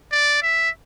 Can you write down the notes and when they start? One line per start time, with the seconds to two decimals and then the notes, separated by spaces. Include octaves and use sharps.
0.12 D5
0.42 E5